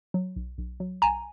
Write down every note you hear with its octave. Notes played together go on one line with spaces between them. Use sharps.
F#3
B1
B1
F#3
B1 G#5 A#5